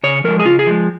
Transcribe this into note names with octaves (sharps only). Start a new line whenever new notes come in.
C#3 C#5
F3 G#3 A#4
G#4
C#3 F4
G#4
F3 G#3